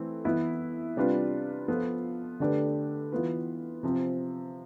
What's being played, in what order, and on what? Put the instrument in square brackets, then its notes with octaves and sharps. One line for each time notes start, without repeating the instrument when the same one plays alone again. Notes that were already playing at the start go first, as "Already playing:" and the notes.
Already playing: [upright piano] E3 A3 C4
E3 B3 E4 B4
C3 G3 D4 F4 B4
F3 B3 F4 A4
D3 A3 D4 G4 B4
E3 B3 F4 B4
C3 F3 C4